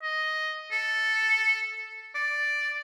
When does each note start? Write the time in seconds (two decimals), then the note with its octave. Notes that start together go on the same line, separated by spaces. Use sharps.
0.02 D#5
0.72 A4
2.15 D5